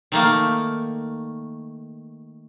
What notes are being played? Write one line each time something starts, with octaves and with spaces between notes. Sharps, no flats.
D#3 A3 A#3